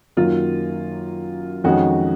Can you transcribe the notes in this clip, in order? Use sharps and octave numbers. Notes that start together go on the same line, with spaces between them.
F#2 D#3 F#3 A#3 F4
F2 D#3 G#3 C#4 F#4